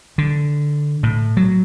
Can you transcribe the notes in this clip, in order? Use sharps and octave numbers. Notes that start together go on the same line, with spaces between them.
D3
A2
F#3